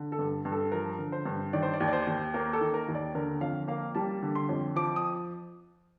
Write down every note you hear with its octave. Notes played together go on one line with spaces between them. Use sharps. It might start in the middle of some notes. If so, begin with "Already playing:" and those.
Already playing: D3
A4
G2
G2
A4
F3 A#4
D3
C5
G2
D#3 D5
C5
D5
D#2
D5
C5
D#2
A#3 A#4
A4
D#3
A#4
D#2
D5
D3 A#4
F2 F5
A#3 F5
G3 A5
D3
C6
F2
F3 D6
D#6